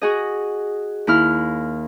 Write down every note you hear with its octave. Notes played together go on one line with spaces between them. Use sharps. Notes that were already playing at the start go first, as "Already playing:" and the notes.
F#4 G#4 D#5
D#2 E4 F6